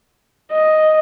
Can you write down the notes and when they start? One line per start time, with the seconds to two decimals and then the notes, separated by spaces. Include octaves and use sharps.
0.52 D#5